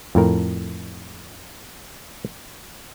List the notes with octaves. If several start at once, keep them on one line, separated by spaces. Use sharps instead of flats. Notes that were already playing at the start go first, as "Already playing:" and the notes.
F2 A2 A#4